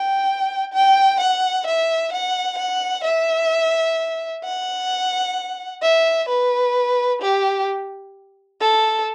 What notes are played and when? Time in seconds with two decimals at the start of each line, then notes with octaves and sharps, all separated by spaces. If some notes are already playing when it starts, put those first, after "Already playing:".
Already playing: G5
0.73 G5
1.20 F#5
1.67 E5
2.13 F#5
2.58 F#5
3.04 E5
4.44 F#5
5.82 E5
6.29 B4
7.22 G4
8.60 A4